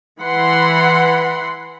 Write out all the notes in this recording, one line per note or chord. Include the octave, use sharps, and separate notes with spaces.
E3 F#5 B5 C6